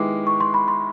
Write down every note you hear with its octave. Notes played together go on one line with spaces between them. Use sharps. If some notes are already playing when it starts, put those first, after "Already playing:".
Already playing: D#3 G#3 B3 E4 G4 D6
C#6
C6
B5
C6